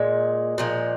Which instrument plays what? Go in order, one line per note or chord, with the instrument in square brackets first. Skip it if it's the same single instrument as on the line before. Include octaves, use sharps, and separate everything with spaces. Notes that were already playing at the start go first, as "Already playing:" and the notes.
Already playing: [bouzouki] A#2 G#3
A#2 F3 G#3